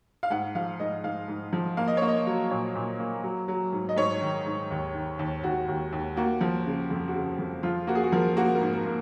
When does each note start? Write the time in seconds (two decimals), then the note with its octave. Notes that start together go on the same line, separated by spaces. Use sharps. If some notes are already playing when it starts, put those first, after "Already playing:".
0.23 F5
0.30 G#2 F#5
0.55 F3 F5
0.80 G#2 D#5
1.04 G#2 F5
1.28 G#2
1.53 F3
1.77 A#3 F5
1.88 D#5
1.97 A#3 C#5
2.08 D#5
2.27 F#3
2.50 A#2 C#5
2.75 A#2
2.99 A#3
3.23 F#3
3.48 F#3
3.73 G#2
3.89 D#5
3.96 G#2 C#5
4.21 D#3
4.46 G#2
4.71 D#2
4.94 D#3
5.19 D#2
5.43 D#2 F#4
5.68 D#2
5.92 D#2
6.17 A#3 F#4
6.41 F3
6.66 C#3
6.90 F2
7.08 F#4
7.15 C#3
7.39 F2
7.63 F3 F4
7.87 A#3 F#4
7.95 G#4
8.03 F#4
8.12 F3 A#4
8.37 A#3 F#4
8.55 A#4
8.61 G#2
8.73 A#4
8.86 A#3